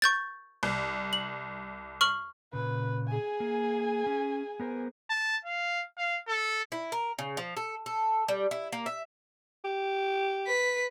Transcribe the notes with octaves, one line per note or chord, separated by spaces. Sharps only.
C#6 G6 A6
C2
F#7
C#6 F6 F#7
A#2 C#3 B4
G#4 G#5
A#3
C#4
B3 A#4 C5
A5
F5
F5
A4
E4
A#4
C#3
F3
A4
A4
G3
E4
A#3
E5
G4
B4 B6